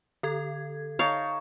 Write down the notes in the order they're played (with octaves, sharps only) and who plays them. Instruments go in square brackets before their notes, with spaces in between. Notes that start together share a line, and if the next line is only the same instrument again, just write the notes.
[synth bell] D3 A4 G#6
[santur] D#4 C#5 A5 [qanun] F5